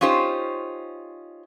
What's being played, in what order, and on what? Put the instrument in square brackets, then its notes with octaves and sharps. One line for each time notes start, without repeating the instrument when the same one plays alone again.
[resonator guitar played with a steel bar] C#4 D#4 F4 G4 C5